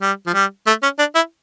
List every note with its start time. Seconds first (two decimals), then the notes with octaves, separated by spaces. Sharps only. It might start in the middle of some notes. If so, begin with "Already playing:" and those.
0.01 G3
0.27 F3
0.34 G3
0.67 A3
0.83 C#4
0.99 D4
1.15 E4